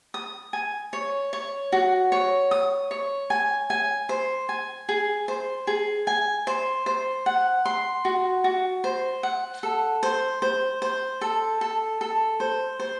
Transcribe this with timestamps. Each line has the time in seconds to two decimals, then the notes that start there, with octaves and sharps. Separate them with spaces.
0.14 D#6
0.53 G#5
0.93 C#5
1.33 C#5
1.72 F#4
2.12 C#5
2.51 D#6
2.91 C#5
3.30 G#5
3.70 G#5
4.09 C5
4.49 G#5
4.89 G#4
5.28 C5
5.67 G#4
6.07 G#5
6.47 C5
6.86 C5
7.26 F#5
7.66 C6
8.05 F#4
8.44 F#4
8.84 C5
9.23 F#5
9.63 A4
10.03 C5
10.42 C5
10.82 C5
11.21 A4
11.61 A4
12.01 A4
12.40 C5
12.80 C5